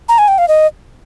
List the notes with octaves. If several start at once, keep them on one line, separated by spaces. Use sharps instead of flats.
A#5
G#5
G5
F5
D#5